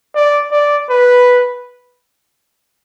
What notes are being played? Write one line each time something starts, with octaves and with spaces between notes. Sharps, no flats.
D5
D5
B4